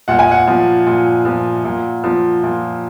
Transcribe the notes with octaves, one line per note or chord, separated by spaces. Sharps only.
A#2 F#5
G#5
F#5
F3
A#2
F3
A#2
F3
A#2